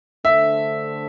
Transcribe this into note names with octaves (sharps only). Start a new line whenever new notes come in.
D3 A3 D4 A4 C5 E5